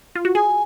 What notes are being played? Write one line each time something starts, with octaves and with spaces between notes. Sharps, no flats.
F4
F#4
G#4 G#5